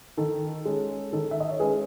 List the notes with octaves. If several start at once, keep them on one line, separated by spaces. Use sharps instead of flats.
D#3 A4
G#3 C#4
D#3 A4
E5
D#5
C#5
G#3 C#4 G#4 B4